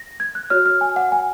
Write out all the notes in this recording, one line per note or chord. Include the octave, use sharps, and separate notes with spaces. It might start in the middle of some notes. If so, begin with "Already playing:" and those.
Already playing: A#6
G#6
F#6
F#4 C#5 F6
F6
G#5
F#5
G#5